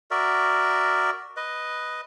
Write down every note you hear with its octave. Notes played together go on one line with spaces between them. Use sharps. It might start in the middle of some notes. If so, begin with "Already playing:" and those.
F#4 A#4 D5 E5
B4 D#5